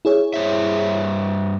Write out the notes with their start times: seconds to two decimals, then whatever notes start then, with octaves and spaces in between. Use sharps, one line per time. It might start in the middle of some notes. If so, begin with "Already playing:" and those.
0.05 E4 G#4 C#5
0.34 G2 C5 E5